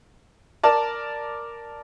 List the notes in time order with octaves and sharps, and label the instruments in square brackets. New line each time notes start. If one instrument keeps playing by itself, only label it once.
[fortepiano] A#4 D5 A5